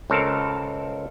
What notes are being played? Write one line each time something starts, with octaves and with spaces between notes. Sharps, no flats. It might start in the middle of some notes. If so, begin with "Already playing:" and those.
C#2 C4 A4 A#4 F5